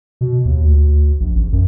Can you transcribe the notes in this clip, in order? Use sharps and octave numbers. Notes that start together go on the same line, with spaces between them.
B2
D#2
D2
A#1
A1
F#2